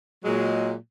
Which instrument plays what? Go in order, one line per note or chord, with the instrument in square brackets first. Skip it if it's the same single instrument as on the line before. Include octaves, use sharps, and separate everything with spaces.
[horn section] A#2 F#3 G#3